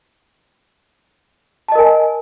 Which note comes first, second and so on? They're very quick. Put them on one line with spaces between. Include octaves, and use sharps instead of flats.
A5 D#5 A#4 G#5